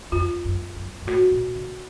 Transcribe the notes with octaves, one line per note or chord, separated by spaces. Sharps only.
F2 F4
F#2
F#2
F#2
A2 F#4
A#2
C3